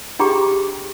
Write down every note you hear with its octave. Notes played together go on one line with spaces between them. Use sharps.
D4 G4 G#4 G5 A#5 D6